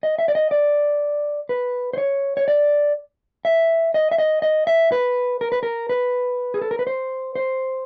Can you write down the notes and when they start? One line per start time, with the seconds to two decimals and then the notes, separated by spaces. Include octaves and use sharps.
0.03 D#5
0.19 E5
0.28 D5
0.35 D#5
0.51 D5
1.49 B4
1.93 C5
1.98 C#5
2.37 C#5
2.48 D5
3.45 E5
3.94 D#5
4.11 E5
4.18 D#5
4.42 D#5
4.67 E5
4.92 B4
5.41 A#4
5.52 B4
5.63 A#4
5.89 B4
6.54 G#4
6.62 A4
6.71 A#4
6.79 B4
6.87 C5
7.36 C5